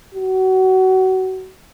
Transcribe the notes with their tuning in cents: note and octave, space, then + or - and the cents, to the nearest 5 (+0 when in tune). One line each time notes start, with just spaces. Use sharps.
F#4 +25